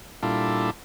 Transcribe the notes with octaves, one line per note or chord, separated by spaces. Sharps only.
A#2 G3 D4 E4 F4 A4